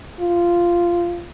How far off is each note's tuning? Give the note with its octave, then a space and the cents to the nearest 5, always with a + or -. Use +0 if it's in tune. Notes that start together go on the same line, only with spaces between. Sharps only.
F4 -10